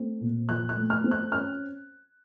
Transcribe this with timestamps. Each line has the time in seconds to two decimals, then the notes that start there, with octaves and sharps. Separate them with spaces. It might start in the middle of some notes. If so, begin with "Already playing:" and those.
Already playing: A3 C4
0.21 A#2
0.49 F3 F#6
0.69 F#6
0.76 A3
0.90 F6
1.04 C4
1.11 F#6
1.32 C#4 F6